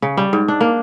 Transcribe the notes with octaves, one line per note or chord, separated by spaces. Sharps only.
C#3
G3
G#2
D4
A#3